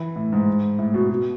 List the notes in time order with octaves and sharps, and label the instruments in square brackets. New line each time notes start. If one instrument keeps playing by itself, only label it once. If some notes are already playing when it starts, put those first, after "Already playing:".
Already playing: [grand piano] E3
A2
G#2
A2
B2
B2